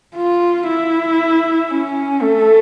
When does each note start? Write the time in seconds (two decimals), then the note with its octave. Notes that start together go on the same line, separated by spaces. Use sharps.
0.16 F4
0.68 E4
1.71 C#4
2.22 A3